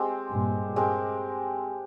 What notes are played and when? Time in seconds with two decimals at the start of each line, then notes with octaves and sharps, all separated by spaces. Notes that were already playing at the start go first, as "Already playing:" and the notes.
Already playing: G#3 C4 G4
0.33 G2 A#2
0.76 G#3 C4 G4 A#4